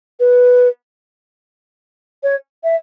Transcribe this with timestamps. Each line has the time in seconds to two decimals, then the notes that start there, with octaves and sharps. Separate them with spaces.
0.20 B4
2.23 C#5
2.64 E5